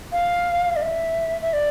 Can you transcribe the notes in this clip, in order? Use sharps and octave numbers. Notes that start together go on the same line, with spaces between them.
F5
D5
E5
E5
D5